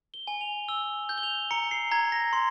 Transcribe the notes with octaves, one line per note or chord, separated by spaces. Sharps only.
G7
G#5
F7
E6 G7
G6
G7
F7
A#5 C#7
C7
A#5 G#6
A#6
C6